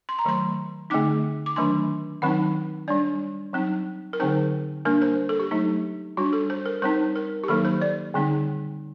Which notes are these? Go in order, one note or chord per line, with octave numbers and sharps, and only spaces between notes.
C6
A#5
D#3 F#3 A3 C6
D3 A3 C4 D#4 D6
D6
D#3 F#3 A3 D4 C6
D#3 F#3 C4 D#4 F#5
G3 D4 D5
F#3 C4 D#4
A#4
D3 F#3 C4 D#4 C5
G3 A#3 D4 A#4
C5
A4
G4
F#3 A3 D#4
G3 D4 F#4
A4
C5
A#4
G3 C4 D#4 C5
A#4
G4
D#3 F#3 A#3 D#4 A4
C5
D5
D3 G3 C4 D#4